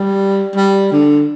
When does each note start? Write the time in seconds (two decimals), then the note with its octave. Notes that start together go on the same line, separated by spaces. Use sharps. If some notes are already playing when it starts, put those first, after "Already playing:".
Already playing: G3
0.55 G3
0.92 D3